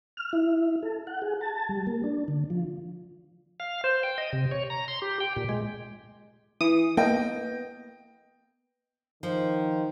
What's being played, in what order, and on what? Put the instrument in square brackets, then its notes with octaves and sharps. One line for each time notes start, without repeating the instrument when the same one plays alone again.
[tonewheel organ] F6
E4
A4
F#5
G#4
A5
G3
A#3
D4
D3
F3
F5
C5
G5
D#5
C3
C#5
A#5
C6
G4
G5
A#2
G#3
[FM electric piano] E3 [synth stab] D#6
[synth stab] A#3 [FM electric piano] B3 [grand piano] D#5 G5
[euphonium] D#3 [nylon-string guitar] F3